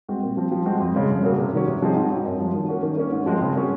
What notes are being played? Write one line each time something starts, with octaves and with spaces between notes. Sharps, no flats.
G#3 C4 F#4
A#2
F3 C4
F3
G#3 C4 F#4
F2
C#3 G#3
F2
C#3 F#3 A#3
C3
D#3 F#3 C#4
C3
F3 C4 D#4 G#4
G#2
F#3 C4 D#4
F#2
F3 G#3
D#3
A#3 C#4 F#4
D#3
A#3 C#4
G#2
F3 G#3 C4
C#3
F#3 A#3 C#4 G#4